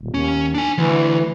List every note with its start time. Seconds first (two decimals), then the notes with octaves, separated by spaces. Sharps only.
0.01 D#1
0.14 D#2 C#4
0.54 D4 G#5
0.78 D2 E3